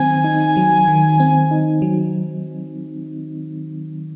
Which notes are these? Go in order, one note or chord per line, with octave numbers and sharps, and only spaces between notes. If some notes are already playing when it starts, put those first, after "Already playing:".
Already playing: D#3 F#3 C4 G#5
D#4
F#3
D#3
C4
D#4
F#3